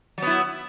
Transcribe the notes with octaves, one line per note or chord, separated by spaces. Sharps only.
F#3 B3 E4